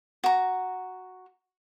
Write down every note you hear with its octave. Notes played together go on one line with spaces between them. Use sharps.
F#4 A#5